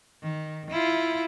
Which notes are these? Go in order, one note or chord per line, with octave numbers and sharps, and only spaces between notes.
D#3
E4 F4